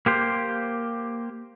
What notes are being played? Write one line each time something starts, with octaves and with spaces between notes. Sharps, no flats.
A#3 G4 C5